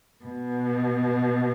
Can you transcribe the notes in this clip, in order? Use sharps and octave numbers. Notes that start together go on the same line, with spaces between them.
B2